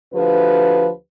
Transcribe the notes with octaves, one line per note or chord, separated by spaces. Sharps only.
D2 F3 G4 B4